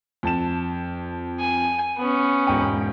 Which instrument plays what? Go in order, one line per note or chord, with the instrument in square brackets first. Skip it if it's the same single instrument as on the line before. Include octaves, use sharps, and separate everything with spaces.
[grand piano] F2 A5 E7
[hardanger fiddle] G#5
B3 C#4
[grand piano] E1 G#2 G5